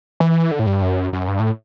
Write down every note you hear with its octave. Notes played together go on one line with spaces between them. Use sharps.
E3
D3
A2
G2
F#2
F#2
G2
A2